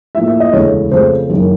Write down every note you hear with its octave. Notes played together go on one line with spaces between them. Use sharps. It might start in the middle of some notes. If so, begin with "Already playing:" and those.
A2 F3 A#3 E5
E5
D#5
E1 D2 C#3 E3 A3 C#5
F2 C#3 F3 A3 C4 C5
F#1 F#2 D#3